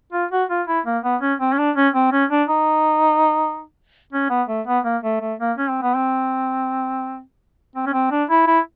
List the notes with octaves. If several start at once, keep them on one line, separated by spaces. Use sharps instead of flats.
F4
F#4
F4
E4
A#3
B3
C#4
C4
C#4
D4
C#4
C4
C#4
D4
D#4
C#4
B3
A3
B3
A#3
A3
A3
A#3
C#4
C4
B3
C4
C4
C#4
C4
D4
E4
E4